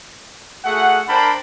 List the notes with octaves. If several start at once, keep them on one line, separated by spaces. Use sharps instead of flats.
A3 F#4 G#4 F#5
D4 A#4 C5 G5 A5 B5